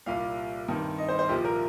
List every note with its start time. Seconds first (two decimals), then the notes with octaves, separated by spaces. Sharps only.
0.06 C2 A#2 G3 F5
0.68 G2 D#3 C4
0.98 D#5
1.08 C5
1.19 C5
1.29 C2 A#2 F3 G4
1.45 A#4